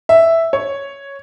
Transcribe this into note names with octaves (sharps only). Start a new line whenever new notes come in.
E5
C#5